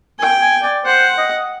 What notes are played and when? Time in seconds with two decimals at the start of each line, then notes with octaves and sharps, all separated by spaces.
0.19 G5 G#5
0.42 G#5
0.63 D5
0.85 C5 F#5
1.18 D#5